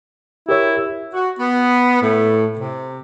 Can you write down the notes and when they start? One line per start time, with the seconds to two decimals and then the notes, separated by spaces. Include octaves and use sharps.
0.49 E4 G4 A#4 C#5
1.13 F#4
1.40 B3
2.02 A2
2.58 C3